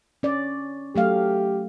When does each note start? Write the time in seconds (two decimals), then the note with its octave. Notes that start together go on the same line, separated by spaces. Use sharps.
0.23 C#4 D5
0.96 F#3 A3 G4 F5